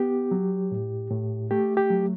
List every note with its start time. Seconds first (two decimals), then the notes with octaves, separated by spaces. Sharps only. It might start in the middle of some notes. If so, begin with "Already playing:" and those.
Already playing: B3 G4
0.31 F#3
0.72 A2
1.10 A2
1.51 A3 G4
1.77 G4
1.90 F#3